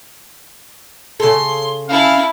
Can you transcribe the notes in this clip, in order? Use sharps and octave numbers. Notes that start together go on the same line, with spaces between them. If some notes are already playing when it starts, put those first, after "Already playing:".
C#3 A4 C6
C#4 E4 F5 A5